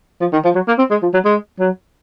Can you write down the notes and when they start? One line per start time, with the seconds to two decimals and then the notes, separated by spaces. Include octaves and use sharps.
0.21 F3
0.33 D#3
0.45 F3
0.55 F#3
0.68 A#3
0.78 C4
0.90 G#3
1.03 F3
1.14 F#3
1.25 G#3
1.59 F#3